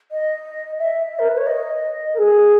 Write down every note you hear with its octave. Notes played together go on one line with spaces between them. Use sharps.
D#5
E5
A#4
B4
C#5
D#5
A#4
G#4